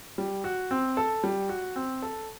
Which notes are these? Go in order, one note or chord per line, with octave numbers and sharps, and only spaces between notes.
G3
F#4
C4
A4
G3
F#4
C4
A4